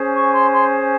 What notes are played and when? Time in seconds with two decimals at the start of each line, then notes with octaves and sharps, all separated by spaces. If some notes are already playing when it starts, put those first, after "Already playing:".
Already playing: C#4 G#4 C5
0.13 C#6
0.32 C6
0.51 C6